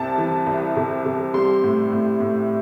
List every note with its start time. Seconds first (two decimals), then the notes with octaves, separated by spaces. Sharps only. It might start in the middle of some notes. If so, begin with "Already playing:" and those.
Already playing: C2 C3 A5
0.18 E3
0.46 C2
0.77 C3
1.06 C3
1.34 G3 C6
1.63 A2
1.92 A2
2.20 A2